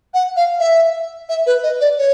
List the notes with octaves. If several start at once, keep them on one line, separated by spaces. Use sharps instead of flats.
F#5
F5
E5
E5
B4
D#5
D5
C#5